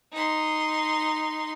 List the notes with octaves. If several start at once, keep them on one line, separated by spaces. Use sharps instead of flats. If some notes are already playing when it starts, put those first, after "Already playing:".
D#4 C6